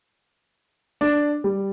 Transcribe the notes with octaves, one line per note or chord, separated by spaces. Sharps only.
D4
G3